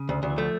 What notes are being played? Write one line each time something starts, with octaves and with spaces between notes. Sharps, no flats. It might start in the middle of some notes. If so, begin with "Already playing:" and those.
Already playing: C#3
D2
D2
E3
F3 A3